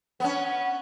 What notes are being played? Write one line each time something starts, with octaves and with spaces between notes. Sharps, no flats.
B3 C#4